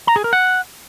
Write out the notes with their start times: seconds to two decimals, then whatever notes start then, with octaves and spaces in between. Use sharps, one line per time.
0.07 A#5
0.16 G#4
0.24 A#4
0.33 F#5